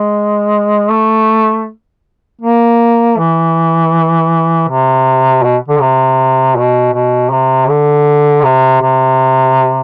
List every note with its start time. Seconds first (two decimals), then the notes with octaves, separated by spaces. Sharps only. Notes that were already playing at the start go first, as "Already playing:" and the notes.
Already playing: G#3
0.91 A3
2.41 A#3
3.18 E3
4.68 C3
5.43 B2
5.68 D3
5.80 C3
6.56 B2
6.93 B2
7.31 C3
7.69 D3
8.44 C3
8.81 C3